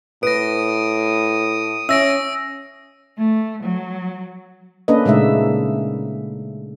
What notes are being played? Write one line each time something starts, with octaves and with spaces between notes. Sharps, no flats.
A2 B4 D#6 A#6 D7
C#4 E5 E6 A#6 D7
A3
F#3
A#3 C#4 D4 A4 B4 D#5
A#2 C#3 G#3 A3 D#4 E5